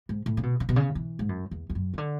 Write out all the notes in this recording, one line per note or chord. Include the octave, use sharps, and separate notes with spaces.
G#2
A2
C#3
B2
C#3
B2
C#3
E3
G#2
F#2
E2
E2
F#2
C#3
D3